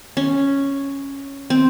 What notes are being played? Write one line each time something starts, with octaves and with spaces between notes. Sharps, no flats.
C#4
C4